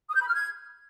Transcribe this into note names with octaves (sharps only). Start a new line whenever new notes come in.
D#6
G6
B5
F6
G#6